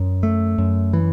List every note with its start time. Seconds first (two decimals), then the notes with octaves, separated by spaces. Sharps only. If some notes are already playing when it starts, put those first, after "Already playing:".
Already playing: F#2
0.23 A3
0.58 F#2
0.93 E3